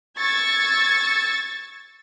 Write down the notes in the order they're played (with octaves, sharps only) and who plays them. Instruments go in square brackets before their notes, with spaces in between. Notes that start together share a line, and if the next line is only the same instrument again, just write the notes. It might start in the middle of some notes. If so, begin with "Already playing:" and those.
[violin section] C#6 E6 G#6 A6